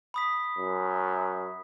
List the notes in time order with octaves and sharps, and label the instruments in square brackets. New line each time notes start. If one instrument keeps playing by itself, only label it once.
[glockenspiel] B5 D#6 B6
[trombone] F#2